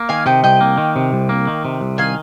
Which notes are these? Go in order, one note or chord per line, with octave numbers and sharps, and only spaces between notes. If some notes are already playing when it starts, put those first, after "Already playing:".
Already playing: A#3
D#3 F5 G#5
C3 D#5 G5
C2 D#5 G5
A#3
D#3
C3
C2
A#3
D#3
C3
C2
D#3 F5 G#5